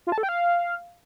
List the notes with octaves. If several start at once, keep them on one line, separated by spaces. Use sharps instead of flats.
F4
A5
A4
G5
F5